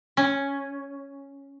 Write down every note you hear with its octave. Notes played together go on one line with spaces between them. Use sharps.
C#4